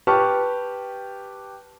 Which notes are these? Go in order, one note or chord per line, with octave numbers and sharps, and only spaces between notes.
G4 B4 A5 C#6 F6